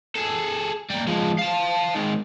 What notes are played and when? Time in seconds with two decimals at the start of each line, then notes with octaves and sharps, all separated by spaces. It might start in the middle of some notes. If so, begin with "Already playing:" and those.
0.16 G#4 A4
0.90 G3 A#3
1.07 F3 G#3
1.39 F5 A5
1.95 D#3 G#3